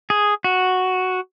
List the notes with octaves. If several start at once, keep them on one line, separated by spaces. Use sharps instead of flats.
G#4
F#4